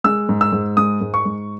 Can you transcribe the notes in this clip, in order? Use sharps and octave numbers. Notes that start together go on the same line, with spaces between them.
G#3 E6
G#2
E6
G#2
G#3 D#6
G#2
C#6
G#2